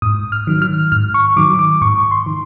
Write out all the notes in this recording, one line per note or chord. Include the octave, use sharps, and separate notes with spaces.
G#2 D#6
F6
D#3 F#3
F6
G#2 F6
C#6
D#3 F#3 D6
D6
G#2 C#6
C6
D#3